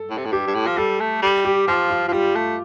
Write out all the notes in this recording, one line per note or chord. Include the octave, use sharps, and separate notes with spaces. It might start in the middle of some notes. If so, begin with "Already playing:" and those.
Already playing: A4
A2
C3
A2
G2 G4
G2
A2
F3
G3 A4
A3
G3
G4
F3 F4
F4
F3
G3 F4
A3